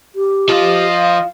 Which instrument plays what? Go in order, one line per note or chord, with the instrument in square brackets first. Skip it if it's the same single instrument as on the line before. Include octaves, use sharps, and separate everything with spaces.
[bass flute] G4
[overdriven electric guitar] F3 F4 [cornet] D#5
[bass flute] F5